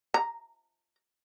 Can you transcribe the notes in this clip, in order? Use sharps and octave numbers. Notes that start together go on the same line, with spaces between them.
A#5